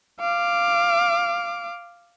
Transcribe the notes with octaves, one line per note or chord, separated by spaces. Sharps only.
F5 D6